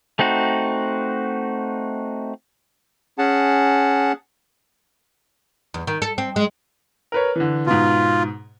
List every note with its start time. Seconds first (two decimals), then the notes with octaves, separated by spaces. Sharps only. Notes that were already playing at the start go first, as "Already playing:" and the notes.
0.19 A3 C4 D#4 F#4
3.18 C#4 G#4 F#5 A5
5.74 E2
5.87 D#3
6.02 A4
6.18 C4
6.36 G#3
7.12 A#4 B4 C#5
7.36 D3 E3
7.66 G#2 B2 F4